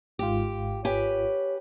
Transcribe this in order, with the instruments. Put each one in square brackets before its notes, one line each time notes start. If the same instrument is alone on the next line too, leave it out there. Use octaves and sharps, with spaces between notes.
[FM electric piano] G#1 G#2 F4 [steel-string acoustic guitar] G4
[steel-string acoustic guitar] G4 B4 G#5 [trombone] C#5